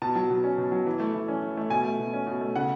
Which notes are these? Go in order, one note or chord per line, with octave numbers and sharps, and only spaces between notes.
B2 A5
F#3
B2
C#4
B2
F#3
E3
A3
E3
C#4
E3
A3
B2 G#5
A3
B2
C#4
B2
A3
C#3 F#5